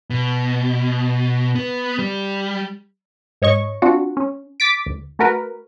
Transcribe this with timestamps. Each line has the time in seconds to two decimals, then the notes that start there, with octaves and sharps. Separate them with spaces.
0.10 B2
1.55 B3
1.99 G3
3.42 G#2 C#5 D#5 C#6
3.82 C4 D4 F4 F#4
4.17 C#4
4.60 D6 A6 B6 D7
4.86 D2
5.19 A3 F#4 A#4 B4